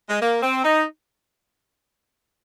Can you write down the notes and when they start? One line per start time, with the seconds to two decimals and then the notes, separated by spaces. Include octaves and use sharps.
0.09 G#3
0.21 A#3
0.42 C4
0.63 D#4